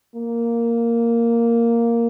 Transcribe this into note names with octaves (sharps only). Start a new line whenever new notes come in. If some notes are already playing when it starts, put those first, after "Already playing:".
A#3